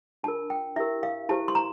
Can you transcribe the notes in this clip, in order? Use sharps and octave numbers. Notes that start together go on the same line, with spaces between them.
D4 F4 A#4 A5
G5
E4 G4 A#4 E5
F5
E4 G4 C5 A5
C6
A#5